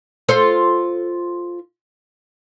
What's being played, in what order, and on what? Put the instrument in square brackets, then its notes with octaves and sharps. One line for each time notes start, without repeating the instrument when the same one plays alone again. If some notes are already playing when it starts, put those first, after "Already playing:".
[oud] F4 A4 C5